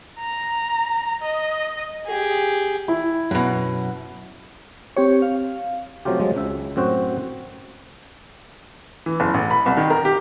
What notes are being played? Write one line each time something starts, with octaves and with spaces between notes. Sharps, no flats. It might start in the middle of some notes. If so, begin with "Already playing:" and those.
A#5
D#5
G4 G#4
E4
F#2 B2
C4 G4 C#5
F5
C3 F3 F#3 A3 F4 G4
F3 F#3 G#3
C#2 C#3 E5
F#2 A2 C4 F#4 C5
E3
F#1
A1
B5
C2
D#3
A#4
G4